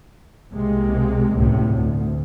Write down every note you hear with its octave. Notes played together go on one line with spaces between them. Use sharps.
C2 C3 G#3 A#3
G1 C#2 A2 C3
D2